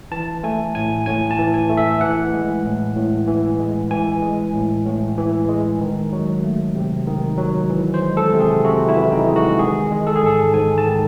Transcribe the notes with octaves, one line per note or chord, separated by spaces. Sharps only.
E3 A5
A3 G#5
A2 G#5
A2 G#5
A5
E3
G#5
A3
E5
E3 F#5
G#3
A2
A2
E3
G#3
E3 G#5
G#3
A2
A2
E3
G#3
D#3
F#3
A3
C3
D#3
F#3
E3
C5
G#3
A4
C3
G#4
C3 F#4
E4
E3
D#4
G#3
F#4
D#3 G#4
G#3
A4
G#4
G#2 A4
G#2 G#5
A5
D#3